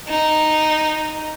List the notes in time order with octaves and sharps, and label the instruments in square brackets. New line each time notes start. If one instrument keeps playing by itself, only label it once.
[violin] D#4